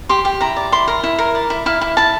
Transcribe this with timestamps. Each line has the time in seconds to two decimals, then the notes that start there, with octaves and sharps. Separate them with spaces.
0.09 G4 C6
0.25 G4
0.41 E4 A#5
0.56 D5
0.72 E4 C6
0.88 A#4 A#5
1.03 E4
1.18 A#4
1.35 D5
1.50 E4
1.66 E4 F5
1.81 E4
1.97 E4 A5